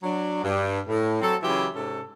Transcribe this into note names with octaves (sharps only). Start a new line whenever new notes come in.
F#3 D4
G2
A2
F#3 C4 A4
C#3 E3 F#3 E4 F4 G4
G#2 C3 C#4 A4